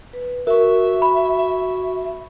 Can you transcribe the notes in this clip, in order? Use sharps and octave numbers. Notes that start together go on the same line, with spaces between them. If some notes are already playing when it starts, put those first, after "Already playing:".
B4
F#4 A#4 E5 C#6
B5